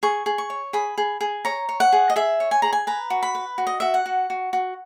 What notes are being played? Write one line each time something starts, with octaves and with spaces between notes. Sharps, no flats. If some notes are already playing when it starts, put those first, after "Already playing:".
G#4 C#6
G#4
C#6
C#5
G#4 B5
G#4
G#4
C#5 A#5
C#5
F#5
G#4
D#5
G#4 E5
C#5
G#5
G#4 A#5
G#5
B4 A#5
F#4
B5
B4
F#4
D#5
F#4 E5
F#5
F#4
F#4
F#4